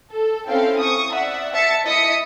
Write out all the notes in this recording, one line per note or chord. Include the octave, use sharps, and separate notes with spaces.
A4
C4 C#4 E4 A4 F5 G5
C#6 D#6
D5 E5 F#5
E5 A5 A6 C#7
E4 D#5 D#6 B6 C#7